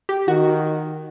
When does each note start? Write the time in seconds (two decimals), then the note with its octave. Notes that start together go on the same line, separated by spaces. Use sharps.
0.09 G4
0.28 D#3 F#4